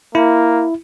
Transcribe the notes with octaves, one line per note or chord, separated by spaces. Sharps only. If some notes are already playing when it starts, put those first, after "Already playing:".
A#3 E4